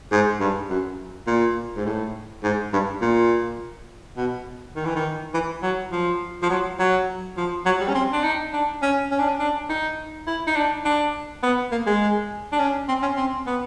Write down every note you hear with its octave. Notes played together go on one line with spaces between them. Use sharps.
G#2
G2
F#2
A#2
G#2
A2
G#2
G2
A#2
B2
D#3
E3
D#3
E3
F#3
F3
F3
F#3
F#3
F3
F#3
G3
C#4
C4
D4
D#4
D4
C#4
C#4
D4
C#4
D4
D#4
E4
D#4
D4
D4
B3
A#3
G#3
D4
C#4
C4
C#4
C4
B3